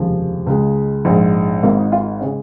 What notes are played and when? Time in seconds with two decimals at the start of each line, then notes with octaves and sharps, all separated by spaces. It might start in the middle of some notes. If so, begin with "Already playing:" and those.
Already playing: F1 D#2 C#3 F3 G#3
0.47 C#2 C#3 G#3
1.05 A#1 G#2 G#3
1.63 G#1 G#2 D#3 A#3
1.78 D#4
1.92 F4
2.21 C#3 G#3 C#4